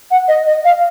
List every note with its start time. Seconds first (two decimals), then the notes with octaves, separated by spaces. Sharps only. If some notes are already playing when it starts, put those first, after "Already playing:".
0.11 F#5
0.28 D#5
0.47 D#5
0.65 F5